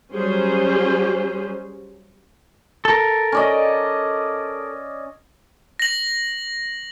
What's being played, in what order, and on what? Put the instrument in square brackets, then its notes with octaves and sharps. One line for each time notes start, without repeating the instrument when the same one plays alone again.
[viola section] F#3 G3 C#4 G#4 C5
[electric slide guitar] A4 A#4
[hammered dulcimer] C#4 D5 D#5
[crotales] A#6 F#7